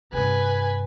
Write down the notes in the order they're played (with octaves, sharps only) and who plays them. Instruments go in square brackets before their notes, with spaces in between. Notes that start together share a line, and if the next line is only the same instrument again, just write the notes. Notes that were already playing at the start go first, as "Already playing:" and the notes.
[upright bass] G2 C3 [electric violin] B4 G#5